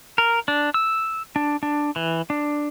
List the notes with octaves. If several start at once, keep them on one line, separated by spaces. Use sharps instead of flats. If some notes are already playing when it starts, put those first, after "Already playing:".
A#4
D4
E6
D4
D4
E3
D4